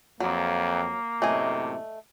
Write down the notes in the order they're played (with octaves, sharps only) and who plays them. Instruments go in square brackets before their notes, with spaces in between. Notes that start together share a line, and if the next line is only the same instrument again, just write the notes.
[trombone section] F2 [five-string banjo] F#3 [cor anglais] A#3
[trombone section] F#2 A2 C3 [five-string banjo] A3 D#5 G#5